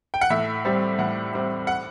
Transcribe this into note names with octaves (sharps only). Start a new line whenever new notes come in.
G5
F#5
A2 E5
G3 C4
A2 F#5
G3 C4
F#5